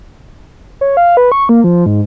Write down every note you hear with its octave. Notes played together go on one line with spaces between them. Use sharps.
C#5
F5
B4
C#6
A#3
F3
G#2